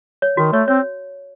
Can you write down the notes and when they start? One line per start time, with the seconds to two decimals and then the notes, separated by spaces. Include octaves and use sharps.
0.22 C#5
0.37 D#3 F#4
0.53 A3 C#5
0.68 C4 C#5